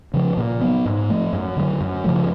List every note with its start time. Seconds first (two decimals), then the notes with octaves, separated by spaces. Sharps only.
0.14 C#3 F3
0.37 A#2
0.61 F#3 B3
0.85 G#2
1.10 F3 A3
1.33 F#2
1.57 D3 F#3
1.81 F#2
2.04 C#3 F3 A3